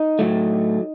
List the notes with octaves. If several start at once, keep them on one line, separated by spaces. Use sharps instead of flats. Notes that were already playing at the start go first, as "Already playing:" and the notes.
Already playing: D#4
A2 F#3 A3